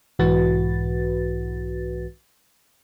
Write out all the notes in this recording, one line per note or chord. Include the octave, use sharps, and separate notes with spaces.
B1 G#2 E3 F#4 B4 A6